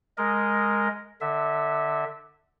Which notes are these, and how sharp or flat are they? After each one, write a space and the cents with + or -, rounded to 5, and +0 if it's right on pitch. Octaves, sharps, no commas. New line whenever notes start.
G#3 +0 A#4 +0 D#5 +0
D3 +20 E5 -15